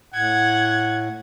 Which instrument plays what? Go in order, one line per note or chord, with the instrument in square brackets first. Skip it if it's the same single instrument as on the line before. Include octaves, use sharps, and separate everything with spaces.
[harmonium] A2 [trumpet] F#5 [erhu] G#6